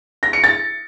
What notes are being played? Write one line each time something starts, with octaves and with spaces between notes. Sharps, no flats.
A#6
C#7
A6